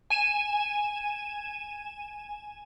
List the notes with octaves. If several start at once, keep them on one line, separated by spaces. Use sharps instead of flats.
G#5 D#7 E7